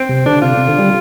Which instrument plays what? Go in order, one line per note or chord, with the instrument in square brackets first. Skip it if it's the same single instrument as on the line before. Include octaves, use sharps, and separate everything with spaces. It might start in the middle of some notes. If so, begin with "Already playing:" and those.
Already playing: [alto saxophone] C4
[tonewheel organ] C3
[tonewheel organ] D3 [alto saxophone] D4
[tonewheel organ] C3 [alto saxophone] F4
[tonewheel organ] C3
D3
G3